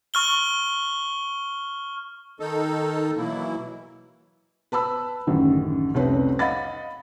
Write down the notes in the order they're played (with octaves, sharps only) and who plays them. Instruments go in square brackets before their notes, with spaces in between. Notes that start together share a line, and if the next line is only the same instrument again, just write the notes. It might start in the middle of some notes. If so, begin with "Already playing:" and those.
[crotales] C#6 F6 G7
[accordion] D#3 D#4 A4
B2 E3 F#3 A#3 E4
[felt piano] B4 A5 B5 E6
A1 F#2 D3 D#3
F1 C2 C4 C#4 B4
D#5 F5 F#5 B5 A6